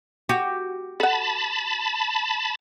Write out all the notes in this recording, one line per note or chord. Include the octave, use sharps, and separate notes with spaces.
F#4 G4
A4 F#5 A5 B5